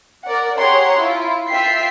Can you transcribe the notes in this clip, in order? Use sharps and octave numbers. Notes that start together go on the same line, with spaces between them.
A#4 D5 F#5
G4 G#4 C#5 F#5 A#5 C6
E4 F4
F4 E5 G5 B6 C7